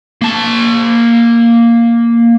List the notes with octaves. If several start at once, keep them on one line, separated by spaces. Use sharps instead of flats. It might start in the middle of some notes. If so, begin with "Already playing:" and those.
A#3 A5